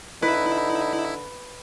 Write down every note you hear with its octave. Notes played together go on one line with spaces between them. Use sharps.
D3 D#4 E4 B4